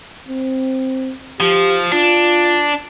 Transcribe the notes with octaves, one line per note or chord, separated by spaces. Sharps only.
C4
F3 G4
D4 F4